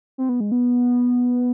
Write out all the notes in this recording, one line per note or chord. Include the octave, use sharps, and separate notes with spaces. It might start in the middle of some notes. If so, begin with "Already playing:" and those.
C4
B3
G#3
B3